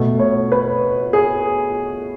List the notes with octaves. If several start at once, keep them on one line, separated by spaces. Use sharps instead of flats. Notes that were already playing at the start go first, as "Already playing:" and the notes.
Already playing: B2 A3
C#5
B4
G#4